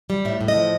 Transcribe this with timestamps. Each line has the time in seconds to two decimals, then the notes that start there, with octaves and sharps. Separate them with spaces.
0.10 G3
0.25 A2 E5
0.41 A2
0.48 D#5
0.56 F3